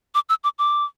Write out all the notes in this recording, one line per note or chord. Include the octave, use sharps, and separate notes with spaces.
D6
E6
D6
D6